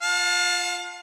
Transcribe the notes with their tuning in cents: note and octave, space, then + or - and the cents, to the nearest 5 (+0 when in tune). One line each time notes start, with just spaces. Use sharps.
F4 +0 F5 +40 A5 +0